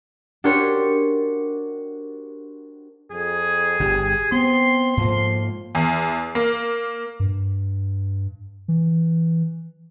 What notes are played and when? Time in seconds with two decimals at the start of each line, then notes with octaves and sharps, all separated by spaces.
0.44 D4 F#4 G4 A#4 C5 C#5
3.12 F2 G#4
3.80 G1 G2 G4
4.32 B3 C4 C6
4.97 G#2 F3 A#3
5.75 E2
6.35 A#3
7.20 G2
8.68 E3